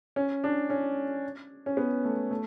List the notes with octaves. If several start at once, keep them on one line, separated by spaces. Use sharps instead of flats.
C#4
D4
C#4
C#4
B3
A3
A3